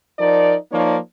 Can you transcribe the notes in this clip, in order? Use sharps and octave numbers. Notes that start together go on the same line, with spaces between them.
F3 D#4 A#4 D5
F3 A#3 D#4 C#5 D5